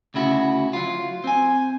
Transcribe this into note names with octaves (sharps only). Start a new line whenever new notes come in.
D2 C#3 E4 F#4
F#3 F4
C4 G#5